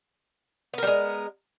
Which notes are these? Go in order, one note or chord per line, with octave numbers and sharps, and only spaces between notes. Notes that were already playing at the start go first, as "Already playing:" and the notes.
G3 G#3 B3 A#4